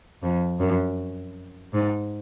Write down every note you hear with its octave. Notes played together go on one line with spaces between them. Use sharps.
F2
F#2
G#2